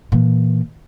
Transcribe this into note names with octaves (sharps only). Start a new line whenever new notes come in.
A#2 E3